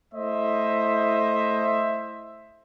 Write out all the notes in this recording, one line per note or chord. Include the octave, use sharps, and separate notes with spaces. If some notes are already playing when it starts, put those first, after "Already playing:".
A3 E4 C5 D#5 E5